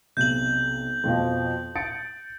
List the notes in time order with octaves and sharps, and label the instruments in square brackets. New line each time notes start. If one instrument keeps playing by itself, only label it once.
[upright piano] B1 C3 [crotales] G6 F#7
[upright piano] F2 B2 F3
A6 C#7 D7